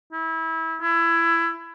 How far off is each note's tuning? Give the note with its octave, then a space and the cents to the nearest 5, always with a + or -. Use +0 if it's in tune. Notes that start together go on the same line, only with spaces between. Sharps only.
E4 -25
E4 +20